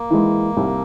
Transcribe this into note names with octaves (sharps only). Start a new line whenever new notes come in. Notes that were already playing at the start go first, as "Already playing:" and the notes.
Already playing: A#3
E3 G#3
C2